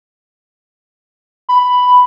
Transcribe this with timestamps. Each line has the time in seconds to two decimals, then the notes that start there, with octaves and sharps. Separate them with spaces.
1.49 B5